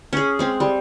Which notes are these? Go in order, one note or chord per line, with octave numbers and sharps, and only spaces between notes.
C#4 G#4
G#3 C4
G3